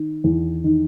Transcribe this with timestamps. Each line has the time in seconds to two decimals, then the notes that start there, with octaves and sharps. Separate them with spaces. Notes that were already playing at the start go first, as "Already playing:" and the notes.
Already playing: D#3
0.24 E2
0.64 D#3